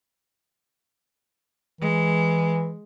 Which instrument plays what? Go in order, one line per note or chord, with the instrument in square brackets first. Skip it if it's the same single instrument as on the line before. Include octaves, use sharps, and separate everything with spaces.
[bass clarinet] E3 [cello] G#3